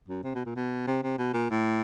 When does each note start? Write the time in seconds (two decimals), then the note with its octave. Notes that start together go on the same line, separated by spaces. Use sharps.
0.08 F#2
0.24 C3
0.35 B2
0.46 A#2
0.56 B2
0.87 C3
1.03 C3
1.18 B2
1.34 A#2
1.50 A2